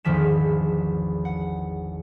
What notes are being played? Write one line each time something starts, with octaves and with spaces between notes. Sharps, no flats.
G#1 E2 D3 F3 B6 E7
F#5